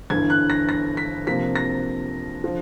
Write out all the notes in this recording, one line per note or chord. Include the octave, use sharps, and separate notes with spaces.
G1 G2 E3 G#6
F#6
A#6
A#6
B6
F2 C3 F3 A#3 B6
A#6
D3 F3